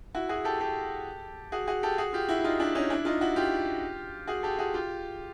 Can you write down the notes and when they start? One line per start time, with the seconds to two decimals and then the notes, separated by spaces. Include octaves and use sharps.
0.15 E4 F#4
0.29 F#4 G#4
0.44 G4 A4
0.60 G4 A4
1.52 F#4 G#4
1.67 F#4 G#4
1.83 G4 A4
1.98 F#4 G#4
2.13 F4 G4
2.29 E4 F#4
2.39 E4
2.44 D#4 F4
2.59 D4 E4
2.75 C#4 D#4
2.90 D4 E4
3.05 D#4 F4
3.21 E4 F#4
3.36 F4 G4
4.27 F#4 G#4
4.43 G4 A4
4.59 F#4 G#4
4.74 F4 G4